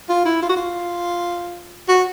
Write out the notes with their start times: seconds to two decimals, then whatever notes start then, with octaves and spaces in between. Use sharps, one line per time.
0.09 F4
0.25 E4
0.42 F4
0.49 F#4
0.57 F4
1.88 F#4